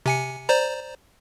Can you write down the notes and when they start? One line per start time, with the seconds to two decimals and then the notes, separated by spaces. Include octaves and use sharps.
0.06 C3 G#5 C#7
0.49 C5 D5 A#5